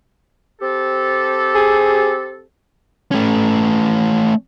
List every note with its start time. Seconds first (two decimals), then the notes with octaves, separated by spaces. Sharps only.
0.61 C4 G4 A4
1.55 G#4
3.12 A3 C#4